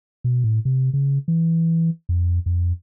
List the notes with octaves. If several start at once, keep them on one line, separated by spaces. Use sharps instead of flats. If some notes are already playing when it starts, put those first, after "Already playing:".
B2
A2
C3
C#3
E3
F2
F2